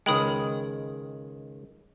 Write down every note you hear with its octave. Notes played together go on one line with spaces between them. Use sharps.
C#2 D#3 G#3 G5 B5 D#6